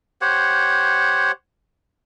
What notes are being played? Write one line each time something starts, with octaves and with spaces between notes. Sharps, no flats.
G4 C5 C#5 F#5